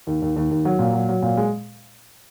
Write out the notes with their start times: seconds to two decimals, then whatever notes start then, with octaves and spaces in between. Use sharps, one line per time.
0.07 D#2
0.22 D#2
0.36 D#2
0.51 D#2
0.65 F#3
0.79 A#2
0.93 F#3
1.09 F#3
1.23 A#2
1.37 G#3